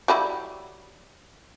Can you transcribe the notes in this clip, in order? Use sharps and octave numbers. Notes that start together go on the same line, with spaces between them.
F#3 G3 E4